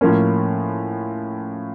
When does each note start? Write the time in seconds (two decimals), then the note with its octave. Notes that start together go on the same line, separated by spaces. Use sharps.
0.01 A2 F3 A#3 C#4